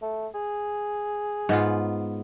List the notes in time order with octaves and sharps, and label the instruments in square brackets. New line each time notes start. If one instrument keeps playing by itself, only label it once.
[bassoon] A3
G#4
[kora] G#2 B3 F4